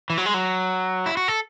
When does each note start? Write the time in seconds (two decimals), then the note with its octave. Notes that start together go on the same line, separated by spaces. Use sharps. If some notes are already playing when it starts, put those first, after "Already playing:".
0.10 E3
0.18 F#3
0.26 G#3
0.34 F#3
1.06 E4
1.17 F#4
1.28 A4